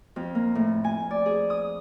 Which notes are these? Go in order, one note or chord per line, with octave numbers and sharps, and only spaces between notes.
F2
A#3
A2
G#5
D5
G#4
D#6